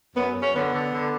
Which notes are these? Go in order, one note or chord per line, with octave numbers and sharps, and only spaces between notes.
F#2 B3
F#2
C#4
D3 B3
D3
D3